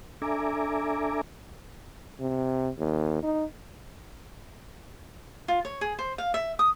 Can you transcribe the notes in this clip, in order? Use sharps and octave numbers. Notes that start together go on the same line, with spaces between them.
D4 A4 E5 G#5 A#5 D6
C3
D#2
D#4
F4
C#5
G#4
C5
F5
E5
D#6